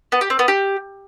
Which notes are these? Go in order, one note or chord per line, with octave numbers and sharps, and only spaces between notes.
B3
G4
C4
B3
G4